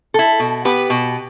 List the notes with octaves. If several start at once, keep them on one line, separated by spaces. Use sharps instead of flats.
E4 A4
B2
B3 G4 B4
B2